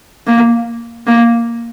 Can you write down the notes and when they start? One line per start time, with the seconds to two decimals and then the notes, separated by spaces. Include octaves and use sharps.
0.27 A#3
1.07 A#3